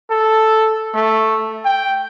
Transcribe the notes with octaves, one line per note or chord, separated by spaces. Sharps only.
A4
A3
G5